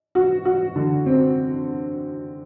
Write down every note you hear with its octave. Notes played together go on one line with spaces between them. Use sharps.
F#4
F#4
D3
C4